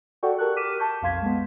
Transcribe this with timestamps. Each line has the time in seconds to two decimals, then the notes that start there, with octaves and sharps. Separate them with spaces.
0.23 F#4 A4 D5 F#5 G5 C#6
0.38 G4 A4 A#4 A5 C#6 F#6
0.56 D6 F6 B6 D#7 E7
0.79 A5 C#6 G6
1.02 B1 F2 F5 C6 G#6 B6
1.22 G#3 B3